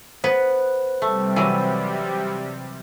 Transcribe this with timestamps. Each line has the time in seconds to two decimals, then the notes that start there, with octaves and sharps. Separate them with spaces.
0.24 B3 C5
1.02 C3 G3 A3
1.36 E3 F#3